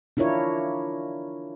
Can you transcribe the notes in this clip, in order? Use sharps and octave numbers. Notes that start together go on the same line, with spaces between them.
D4 E4 F4 A#4 C#5